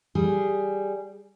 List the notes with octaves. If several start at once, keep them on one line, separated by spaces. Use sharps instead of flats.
G3 G#4